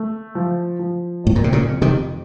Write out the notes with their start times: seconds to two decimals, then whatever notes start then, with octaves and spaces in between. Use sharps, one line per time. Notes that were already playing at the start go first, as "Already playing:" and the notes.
Already playing: A3
0.35 F3
0.79 F3
1.24 F2 A2
1.35 A#2
1.44 C3
1.53 A#2 C#3
1.68 F2
1.82 C3 D#3